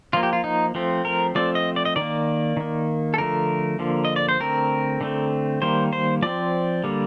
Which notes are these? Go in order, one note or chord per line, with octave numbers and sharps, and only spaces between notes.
F3 A#3 F4
G4
F4
D#4
F3 A3 C4
A#4
F3 A3 C4 D5
D#5
D5
D#5
D#3 D5
A#3
D#3 A#3
A4
D3 F3 A3 A#4
D3 F3 A#3
D#5
D5
C5
D3 A3 C4 A#4
D3 A3 C4
D#3 G3 A#3 C5
C5
F3 C4 D5
D3 G3 A#3